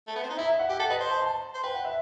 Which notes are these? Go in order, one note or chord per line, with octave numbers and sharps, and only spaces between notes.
A3
B3
C4
D#4
E4 E5
E5
F#5
G4 G5
A4 F#5
B4 D#5
C5
A5
A5
C5
B4 G5
F#5
E5